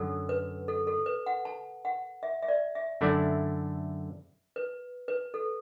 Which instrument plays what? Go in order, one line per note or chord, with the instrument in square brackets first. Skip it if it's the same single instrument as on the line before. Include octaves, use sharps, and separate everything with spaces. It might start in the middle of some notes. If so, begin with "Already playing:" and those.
Already playing: [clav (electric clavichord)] F#2 D3 F#3 [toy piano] A4
[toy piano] B4
A4
A4
B4
F#5
A5
F#5
E5
E5
D5
E5
[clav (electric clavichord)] F#2 D3 A3 E4 D5
[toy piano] B4
B4
A4